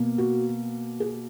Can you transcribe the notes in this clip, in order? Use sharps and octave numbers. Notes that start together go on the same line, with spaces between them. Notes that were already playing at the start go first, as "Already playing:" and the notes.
Already playing: B2 A#3
F#4
G#4